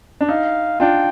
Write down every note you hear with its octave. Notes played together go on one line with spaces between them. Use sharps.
D4
D#4 F5
D4 F4 G5